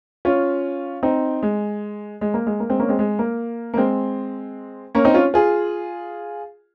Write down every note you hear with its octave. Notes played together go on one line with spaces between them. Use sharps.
C#4 F4
C4 D#4
G#3
G#3
A#3
G#3
A#3
G#3 C4
A#3 C#4
G#3 C4
G#3
A#3
A#3
G#3 C4
A#3 C#4
C4 D#4
C#4 F4
F4 G#4